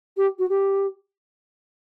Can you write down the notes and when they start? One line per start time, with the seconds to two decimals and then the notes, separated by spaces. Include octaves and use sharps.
0.17 G4
0.39 F#4
0.49 G4